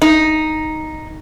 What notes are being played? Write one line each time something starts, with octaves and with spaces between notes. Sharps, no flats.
D#4